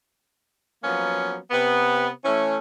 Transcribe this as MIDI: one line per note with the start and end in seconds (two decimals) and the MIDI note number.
0.83 1.37 53
0.83 1.37 54
0.83 1.37 58
0.83 1.37 59
0.83 1.37 61
1.51 2.09 48
1.51 2.09 59
2.25 2.57 52
2.25 2.57 57
2.25 2.57 61